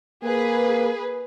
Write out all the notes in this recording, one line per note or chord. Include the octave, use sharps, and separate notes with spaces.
A#3 G#4 B4